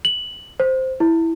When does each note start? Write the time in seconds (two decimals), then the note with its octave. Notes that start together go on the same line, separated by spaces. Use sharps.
0.05 F#7
0.60 C5
1.00 E4